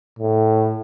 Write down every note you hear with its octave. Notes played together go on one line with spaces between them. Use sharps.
A2